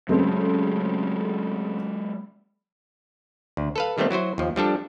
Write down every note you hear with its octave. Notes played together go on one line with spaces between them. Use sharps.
C#3 F#3 G#3 A3 C4
D2
A4 B4 F5
D#3 G3 A3 B3 C4
F#3 E4 F#4 C5
D#2 F3
F3 G3 D4 A4